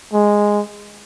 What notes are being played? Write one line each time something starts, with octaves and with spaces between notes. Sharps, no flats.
G#3